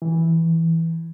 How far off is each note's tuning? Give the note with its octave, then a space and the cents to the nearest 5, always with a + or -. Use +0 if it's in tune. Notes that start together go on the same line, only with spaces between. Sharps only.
E3 -5